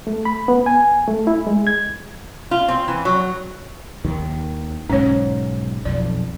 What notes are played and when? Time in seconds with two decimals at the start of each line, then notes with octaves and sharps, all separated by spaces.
0.07 A3
0.25 B5
0.48 B3
0.66 G#5
1.08 A3
1.27 E4
1.47 G#3
1.67 G#6
2.51 F4
2.68 C4
2.88 E3
3.05 F#3
4.05 D#2 D#3
4.90 B1 G#2 C#4 C#5
5.85 B1 F2 D5